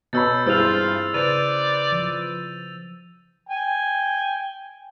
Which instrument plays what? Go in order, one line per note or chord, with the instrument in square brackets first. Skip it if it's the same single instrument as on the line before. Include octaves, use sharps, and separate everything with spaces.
[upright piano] B2 C#5 B5 [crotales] E6 G6 A6
[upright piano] G2 [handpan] E4 G#4 C5 [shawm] F4 [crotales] E6 F7
[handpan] C#3 [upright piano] B4 C5 [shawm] D5 [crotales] A6 D#7 F7
[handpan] F3
[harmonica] G5 G#5